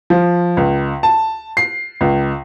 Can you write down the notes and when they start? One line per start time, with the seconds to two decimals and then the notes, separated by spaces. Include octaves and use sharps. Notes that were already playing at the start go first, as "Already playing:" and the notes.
0.10 F3
0.57 C#2
1.03 A5
1.57 C7
2.01 C#2